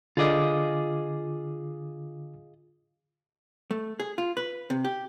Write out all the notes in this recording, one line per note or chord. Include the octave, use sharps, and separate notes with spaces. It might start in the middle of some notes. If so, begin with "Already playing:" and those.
D3 F4 G#4 D#5 D6
A3
G#4
F4
B4
C3
G4